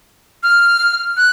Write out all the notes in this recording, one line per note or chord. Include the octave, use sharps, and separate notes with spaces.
F6
F#6